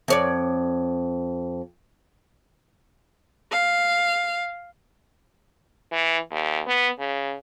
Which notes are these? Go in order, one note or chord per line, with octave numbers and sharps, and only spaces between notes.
F2 C#5 D5
F5
E3
D#2
B3
C#3